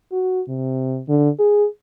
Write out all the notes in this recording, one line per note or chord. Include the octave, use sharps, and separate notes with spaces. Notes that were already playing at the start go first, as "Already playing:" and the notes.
F#4
C3
D3
G#4